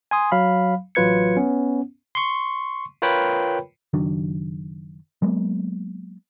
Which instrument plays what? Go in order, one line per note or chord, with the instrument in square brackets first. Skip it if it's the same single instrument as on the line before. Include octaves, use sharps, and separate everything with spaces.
[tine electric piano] G#5 C6 D#6
F#3 F5 B5
A1 F#3 F4 B4 G#6 C#7
B3 C#4
C6 C#6
F4 A#4 B4 C#5 G5 B5
[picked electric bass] F#1 D#3 F#3 D4
F#3 G#3 A#3 B3